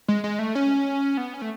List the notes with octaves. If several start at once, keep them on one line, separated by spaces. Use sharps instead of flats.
G#3
G#3
A3
C#4
B3
C#4
A3